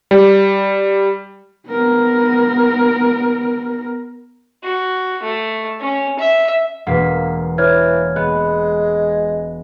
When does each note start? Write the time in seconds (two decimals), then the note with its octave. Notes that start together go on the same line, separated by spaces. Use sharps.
0.11 G3
1.67 B3 A#4
4.64 F#4
5.23 A3
5.81 C#4
6.19 E5
6.87 E1 A#3 B4 F#5 B6
7.58 E3 C#5 F6 G#6
8.16 G#3 B3 F#6